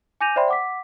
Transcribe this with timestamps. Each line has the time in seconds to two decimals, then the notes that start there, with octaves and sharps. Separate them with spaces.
0.21 G#5 D6 G6 A#6 D#7 F7
0.36 C5 D5 E5 G5 B5 C6
0.48 F#5 D6 B6